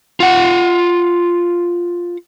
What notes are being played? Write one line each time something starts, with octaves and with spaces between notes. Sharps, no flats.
F4 F#5